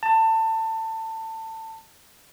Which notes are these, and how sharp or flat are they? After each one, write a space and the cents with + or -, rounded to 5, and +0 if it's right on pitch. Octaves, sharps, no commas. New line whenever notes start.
A5 +25